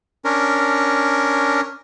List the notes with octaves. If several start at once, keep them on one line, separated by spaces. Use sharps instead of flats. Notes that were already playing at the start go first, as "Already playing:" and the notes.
C#4 D4 A#4